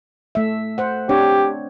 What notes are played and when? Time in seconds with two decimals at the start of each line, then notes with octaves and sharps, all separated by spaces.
0.35 A3 E5
0.78 C5 F#5
1.09 C4 D4 G4 C#5